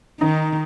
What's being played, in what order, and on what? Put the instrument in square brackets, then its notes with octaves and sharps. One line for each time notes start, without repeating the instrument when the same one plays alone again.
[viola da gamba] D#3 [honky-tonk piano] D#4